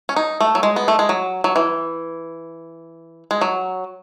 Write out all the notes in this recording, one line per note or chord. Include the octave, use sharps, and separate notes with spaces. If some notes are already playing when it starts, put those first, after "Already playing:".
C#4
D#4
A3
F#3
G#3
B3
A3
G#3
F#3
F#3
E3
G#3
F#3